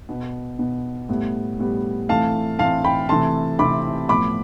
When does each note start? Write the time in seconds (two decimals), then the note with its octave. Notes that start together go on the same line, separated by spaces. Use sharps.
0.09 B2 B3
0.59 B2 B3
1.09 A2 G3 B3
1.59 A2 G3 B3
2.09 A2 E3 A3 C4 F5 A5
2.59 A2 E3 A3 C4 F5 A5
2.84 G5 B5
3.09 C3 E3 A3 C4 A5 C6
3.59 C3 E3 A3 C4 B5 D6
4.09 A2 F3 B3 B5 D6